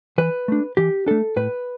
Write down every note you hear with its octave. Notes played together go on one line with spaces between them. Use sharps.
E3 B4
A3 D4
E3 G4
A3 D4 A4
A2 B4